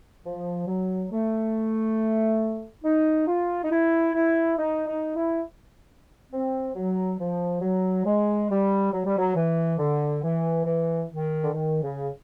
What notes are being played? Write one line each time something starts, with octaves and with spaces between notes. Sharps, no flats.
F3
F#3
A3
D#4
F4
D#4
E4
E4
D#4
D#4
E4
C4
F#3
F3
F#3
G#3
G3
F#3
G3
F#3
E3
D3
E3
E3
D#3
D3
D#3
C#3